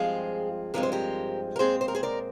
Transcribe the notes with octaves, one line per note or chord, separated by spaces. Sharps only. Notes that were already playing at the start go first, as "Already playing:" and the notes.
Already playing: G2 F3 G#3 C4 F4 G#4
G2 F3 G#3 C4 A#4
C5
G4 A#4
A#4
A#2 G#3 C4 G#4 C5
C5
A#4
G#4 C5
A#4 D5